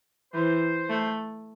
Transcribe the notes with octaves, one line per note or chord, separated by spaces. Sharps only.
E3 C5
A3